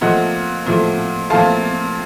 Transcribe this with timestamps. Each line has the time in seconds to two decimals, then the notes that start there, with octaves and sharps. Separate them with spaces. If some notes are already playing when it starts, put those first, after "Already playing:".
0.01 A#2 F3 A3 D#5 F#5
0.66 A#2 F3 A3
1.30 A#2 F3 A3 F5 A5